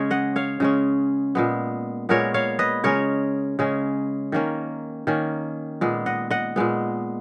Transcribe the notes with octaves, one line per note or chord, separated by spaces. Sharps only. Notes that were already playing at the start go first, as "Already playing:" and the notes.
Already playing: C#3 G#3 C#4 C#5
D#5 F#5
C#5 F5
C#3 G#3 C#4
A#2 G#3 B3
A#2 G#3 B3 A#4 C#5
C#5 F5
B4 D#5
C#3 G#3 C#4 A#4 C#5
C#3 G#3 C#4
D#3 A#3 C#4
D#3 A#3 C#4
A#2 G#3 B3
D#5 F#5
D#5 F#5
A#2 G#3 B3